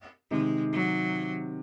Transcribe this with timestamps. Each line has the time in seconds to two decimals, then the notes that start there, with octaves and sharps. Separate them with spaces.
0.31 C3 D#3 G#3
0.73 F#3